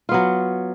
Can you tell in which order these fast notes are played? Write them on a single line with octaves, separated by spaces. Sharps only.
F4 B3 F#3